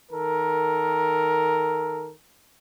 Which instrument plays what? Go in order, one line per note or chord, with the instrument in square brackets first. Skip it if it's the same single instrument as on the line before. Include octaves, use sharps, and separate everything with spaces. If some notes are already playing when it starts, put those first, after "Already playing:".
[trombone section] D#3 A4 A#4